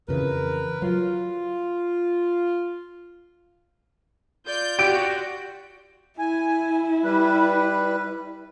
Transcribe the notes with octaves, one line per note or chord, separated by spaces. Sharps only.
F2 C#3 E3 A#4 B4
F#3 F4
F4 D5 G6
F#4 G4 D7
E4 G#5
G3 B4